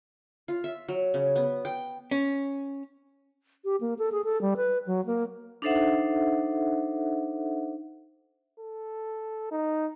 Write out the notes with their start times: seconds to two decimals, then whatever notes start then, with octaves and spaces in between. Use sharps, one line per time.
0.48 F4
0.64 E5
0.88 F#3
1.14 C#3
1.36 B3
1.65 G5
2.11 C#4
3.65 G4
3.81 A#3
3.99 A4
4.12 G#4
4.24 A4
4.42 G3
4.57 B4
4.87 F#3
5.06 A#3
5.62 D4 D#4 A4 C5 E5 F#5
8.60 A4
9.51 D#4